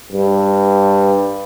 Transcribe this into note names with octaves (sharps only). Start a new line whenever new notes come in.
G2